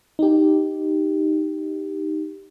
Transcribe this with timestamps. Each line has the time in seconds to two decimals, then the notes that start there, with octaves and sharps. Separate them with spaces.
0.19 D#4 G4